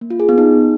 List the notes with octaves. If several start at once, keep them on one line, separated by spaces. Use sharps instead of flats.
A#3
F4
G#4
B3
D#4